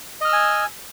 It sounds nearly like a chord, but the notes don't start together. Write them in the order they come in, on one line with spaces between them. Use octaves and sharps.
D#5 F6 E6 G#5